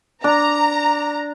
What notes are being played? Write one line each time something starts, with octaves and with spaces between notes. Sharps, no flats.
D4 A#5